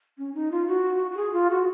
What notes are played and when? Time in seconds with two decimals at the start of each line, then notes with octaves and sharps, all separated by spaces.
0.18 C#4
0.34 D#4
0.51 F4
0.68 F#4
1.11 F#4
1.17 G#4
1.33 F4
1.50 F#4